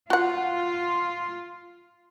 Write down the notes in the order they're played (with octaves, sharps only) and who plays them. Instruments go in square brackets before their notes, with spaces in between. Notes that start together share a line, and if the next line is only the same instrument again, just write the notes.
[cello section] F4 [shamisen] F#4 F#5